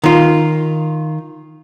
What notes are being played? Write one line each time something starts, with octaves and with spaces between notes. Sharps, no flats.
D#3 F4